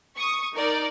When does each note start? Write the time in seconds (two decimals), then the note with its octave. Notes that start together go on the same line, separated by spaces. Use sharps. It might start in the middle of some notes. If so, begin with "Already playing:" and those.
0.16 C#6 D#6
0.55 D#4 A#4 D5